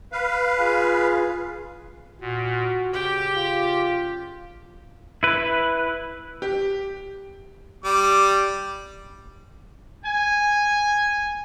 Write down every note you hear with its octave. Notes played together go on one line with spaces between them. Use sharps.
B4 F5
F4 G#4
A#2 F#4
C#3 G4 G5
F4
E4 B4
G4
G3 D6
G#5